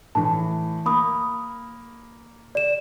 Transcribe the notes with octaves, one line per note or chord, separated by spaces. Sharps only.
A2 E3 A5
A#3 B5 D#6
D5 E7